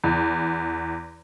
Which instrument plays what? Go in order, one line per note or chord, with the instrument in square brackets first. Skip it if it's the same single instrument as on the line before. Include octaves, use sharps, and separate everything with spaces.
[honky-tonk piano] E2